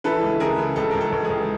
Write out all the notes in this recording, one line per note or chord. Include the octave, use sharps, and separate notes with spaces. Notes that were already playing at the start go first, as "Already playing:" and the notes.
E3 A4 B4
C#2
C#3 G#4 A#4
C#3
C#2 A4
C#2 A#4
A4
C#2
G#4
C#2